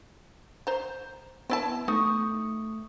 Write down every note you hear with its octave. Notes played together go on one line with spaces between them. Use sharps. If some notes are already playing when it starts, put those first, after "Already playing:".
C5 A#5
B3 C4 E4 A5
A3 D#4 C#6 D#6